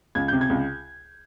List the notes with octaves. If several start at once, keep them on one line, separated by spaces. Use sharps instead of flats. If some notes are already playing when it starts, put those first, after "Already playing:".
C#2 G#6
C3 G6
G#6
C#2